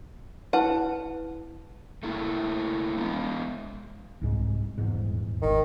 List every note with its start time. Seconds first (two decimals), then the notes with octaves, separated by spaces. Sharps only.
0.53 E4 B4 F#5 A5
2.03 A3 A#3 E4
2.97 G#3 B3
4.22 C2 G#2 G#3
4.78 D#1 E2 G#2
5.42 G#1 D#3